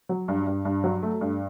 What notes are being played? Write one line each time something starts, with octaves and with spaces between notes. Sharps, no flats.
F#3
G2
G2
G2
F#3
A3
G2